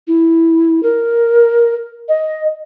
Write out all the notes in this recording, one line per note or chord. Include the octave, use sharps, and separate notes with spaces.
E4
A#4
D#5